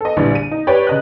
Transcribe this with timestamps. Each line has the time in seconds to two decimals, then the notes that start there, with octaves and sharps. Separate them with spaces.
0.01 A4 D#5
0.17 A#1 D3 E3 G3 D5
0.35 D#7
0.51 D#4
0.67 G4 B4 C#5 D5 G5
0.87 C#3 D#5 F#6